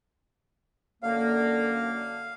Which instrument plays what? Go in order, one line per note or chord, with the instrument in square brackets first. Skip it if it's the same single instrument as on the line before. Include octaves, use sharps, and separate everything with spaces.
[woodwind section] F#2 D3 A#3 [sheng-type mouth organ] F5